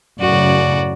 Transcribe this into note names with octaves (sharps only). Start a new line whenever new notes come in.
F#2 A2 C#3 F#4 D5